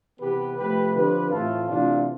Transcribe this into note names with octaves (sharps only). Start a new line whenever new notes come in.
C3 E3 B3 G4 B4
C3 F3 A3 G4 B4
D3 F3 C4 G4 B4
A2 E3 A3 C4 F4 A4
C3 E3 A3 C4 D4 F4